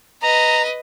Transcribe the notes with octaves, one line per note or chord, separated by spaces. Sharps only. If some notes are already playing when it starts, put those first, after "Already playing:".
B4 D#5 A#5